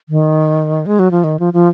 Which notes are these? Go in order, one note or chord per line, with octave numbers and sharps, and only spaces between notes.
D#3
G#3
F#3
F3
D#3
F3
F3